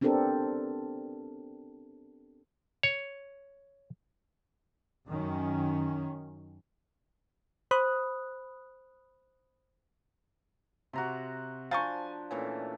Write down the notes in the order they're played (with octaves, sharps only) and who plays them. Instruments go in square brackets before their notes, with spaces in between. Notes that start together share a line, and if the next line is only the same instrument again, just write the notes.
[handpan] B3 C4 D4 G4 A4 A#4
[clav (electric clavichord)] C#5
[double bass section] F#2 D#3 C#4
[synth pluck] C5 B5 D#6 F#6
[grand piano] C3 [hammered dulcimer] F#4 A#5 C6
[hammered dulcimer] F3 D4 [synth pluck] F5 A#5 C#6 [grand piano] G#5 G6 A6
[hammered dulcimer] A#2 E3 A3 [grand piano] C#4